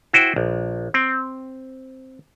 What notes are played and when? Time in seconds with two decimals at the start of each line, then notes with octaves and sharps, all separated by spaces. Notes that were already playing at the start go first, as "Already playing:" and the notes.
0.13 E4 F#4 C5 G5
0.36 A#1
0.94 C4